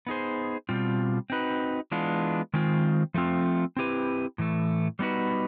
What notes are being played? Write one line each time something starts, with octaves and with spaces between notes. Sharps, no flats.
B3 D#4 G#4 C5
B2 G3 C4 F4
C4 D#4 F#4 B4
E3 G#3 B3 D4 F4
D#3 G#3 C4 F4
F3 A3 C4 F4
C4 E4 G4 B4
A2 E3 A3
G3 B3 D#4 F#4 B4